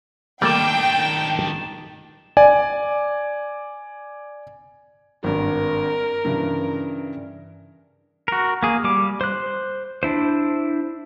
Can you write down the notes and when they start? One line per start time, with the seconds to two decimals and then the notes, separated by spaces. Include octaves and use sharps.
0.42 D#3 G3 A3 A#3 D4 G5 A6 E7
2.37 D5 G#5
5.24 G#1 G2 A#4
6.25 G2 C#3 E3
8.28 F#4 A#4
8.63 A#3 G#4
8.84 G3 D6
9.21 C5 F#6
10.03 D4 E4 C5